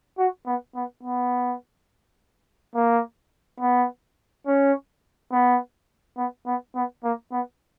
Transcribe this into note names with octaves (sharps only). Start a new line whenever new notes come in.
F#4
B3
B3
B3
A#3
B3
C#4
B3
B3
B3
B3
A#3
B3